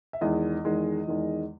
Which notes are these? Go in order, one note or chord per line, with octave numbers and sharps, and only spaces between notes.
E5
E2 D#3 G#3 D#5
E2 D#3 G#3
E2 D#3 G#3